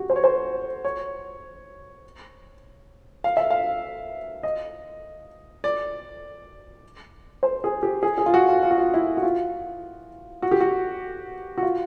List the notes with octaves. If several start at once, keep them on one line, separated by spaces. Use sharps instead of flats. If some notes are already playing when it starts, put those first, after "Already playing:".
Already playing: F#4 G4
C5
C#5
C5
C#5
F5
E5
F5
D#5
D5
C5
G#4
G4
G#4
G#4
F4
F#4
F4
F4
F#4
F4
E4
F#4
F4
F#4
G4
F#4
F#4
F4